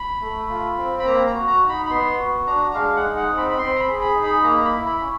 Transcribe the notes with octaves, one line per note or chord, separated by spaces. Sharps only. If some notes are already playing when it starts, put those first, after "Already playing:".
Already playing: B5
A3
F4
C4
B5
A#3 A#5
A#5
F#4
A#5
D#4
B5
B5
B3 C6
F#4
D4 A#5
G#3 F5
F#5
D#4
F#5
C4
B5
B5
C4 C6
A#5
B5
G#4
B5
D#4
B5
A#3 A#5
B5
E4
B5
C#4